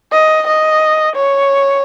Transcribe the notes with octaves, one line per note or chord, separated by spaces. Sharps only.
D#5
D#5
C#5